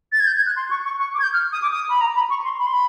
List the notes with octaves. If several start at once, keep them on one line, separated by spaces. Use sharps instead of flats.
A6
G#6
G6
G#6
F#6
C6
C#6
C#6
C#6
D6
G#6
G6
F6
D#6
D6
D#6
B5
A#5
B5
C#6
C6
B5
C6
B5